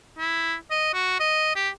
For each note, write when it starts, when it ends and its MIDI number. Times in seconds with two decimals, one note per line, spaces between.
0.19 0.54 64
0.71 0.93 75
0.94 1.15 66
1.20 1.56 75
1.56 1.69 67